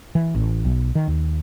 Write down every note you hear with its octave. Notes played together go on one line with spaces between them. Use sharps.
E3
A1
B1
D#3
D#2